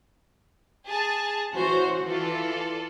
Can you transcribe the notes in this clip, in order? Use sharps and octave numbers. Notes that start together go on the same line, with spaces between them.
G#4 G#5 A5
E3 C#4 F#4 C5
E3 F4 A4 D5